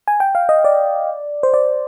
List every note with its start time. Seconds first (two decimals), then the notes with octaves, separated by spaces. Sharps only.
0.08 G#5
0.20 G5
0.35 F5
0.49 D#5
0.65 D5
1.43 C5
1.54 D5